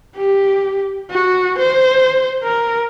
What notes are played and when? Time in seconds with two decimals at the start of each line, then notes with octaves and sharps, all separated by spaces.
0.16 G4
1.11 F#4
1.59 C5
2.43 A#4